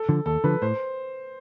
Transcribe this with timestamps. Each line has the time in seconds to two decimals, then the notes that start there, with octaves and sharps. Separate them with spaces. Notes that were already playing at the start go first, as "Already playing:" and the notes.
Already playing: A4
0.09 D3 F3
0.26 D#2 A4
0.44 D3 F3 B4
0.62 A2 C5